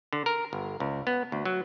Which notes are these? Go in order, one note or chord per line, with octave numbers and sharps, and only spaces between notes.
D3
A#4
G1
C#2
B3
D2
F#3